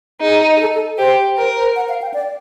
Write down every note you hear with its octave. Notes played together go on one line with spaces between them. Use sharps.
D#4 G#4
G#4
A4
A4
G4 C5
A#4 C5
C5
F#5
F5
G5
D5